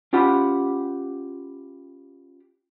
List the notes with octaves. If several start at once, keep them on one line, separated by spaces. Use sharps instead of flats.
C#4 F4 G4 F#5 B5